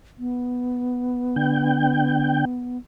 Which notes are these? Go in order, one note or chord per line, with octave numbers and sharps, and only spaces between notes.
B3
D3 G5